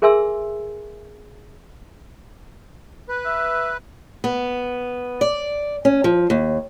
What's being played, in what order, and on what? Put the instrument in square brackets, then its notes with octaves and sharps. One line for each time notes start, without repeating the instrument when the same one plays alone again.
[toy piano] G#4 A#4 E5 G#5 C6 E6
[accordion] B4
[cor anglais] E5
[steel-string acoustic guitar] B3
D5
C#4
F3
D#2